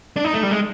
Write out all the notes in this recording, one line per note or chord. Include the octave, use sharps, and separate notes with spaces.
D4
D#4
A3
G3
G#3